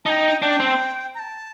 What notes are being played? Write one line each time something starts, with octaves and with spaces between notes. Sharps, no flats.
D#4 G5 A5
D4 G5
C4
A#5
A5